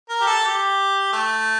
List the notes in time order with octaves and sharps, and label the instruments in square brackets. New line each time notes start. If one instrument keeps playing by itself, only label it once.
[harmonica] A#4
G4
A4
G4
A3